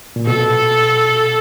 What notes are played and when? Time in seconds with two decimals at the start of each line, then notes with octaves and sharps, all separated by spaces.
0.16 A#2
0.27 B2 A4